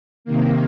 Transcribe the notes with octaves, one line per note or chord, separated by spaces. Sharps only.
C3 D#3 A#3